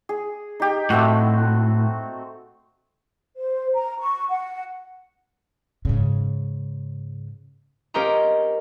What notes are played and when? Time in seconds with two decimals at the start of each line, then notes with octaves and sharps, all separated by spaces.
0.09 G#4
0.60 D#4 G4
0.90 A2 A3 C4 F#4
3.36 C5
3.73 A#5
3.98 C#6
4.29 F#5
5.85 G#2 C#3
7.94 C#4 G4 A#4 C5 D#5 A#5